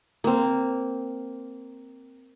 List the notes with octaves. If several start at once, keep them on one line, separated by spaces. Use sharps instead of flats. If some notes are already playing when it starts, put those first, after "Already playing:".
A#3 C4